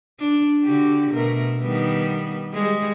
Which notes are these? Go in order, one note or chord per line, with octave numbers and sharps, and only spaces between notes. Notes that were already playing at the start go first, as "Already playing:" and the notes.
D4
D3 F#4 G4
B2 A3 A#4
D#3 G3 B3
G3 G#3